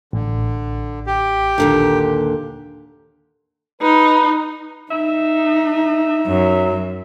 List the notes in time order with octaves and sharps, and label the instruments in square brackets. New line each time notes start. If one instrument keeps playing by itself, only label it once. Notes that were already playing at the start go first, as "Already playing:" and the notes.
[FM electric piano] A1 [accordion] D3
[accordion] G4
[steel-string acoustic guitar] D#2 A#2 D3
[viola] D#4 [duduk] B4
[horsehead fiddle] D#4 [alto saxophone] E5
[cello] F#2 [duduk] F#3